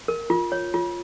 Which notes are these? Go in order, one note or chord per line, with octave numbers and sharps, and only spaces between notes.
A#4
F4
C#5
F4